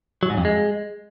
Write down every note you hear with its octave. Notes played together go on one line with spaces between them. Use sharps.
F#3
G#2
F2
G#3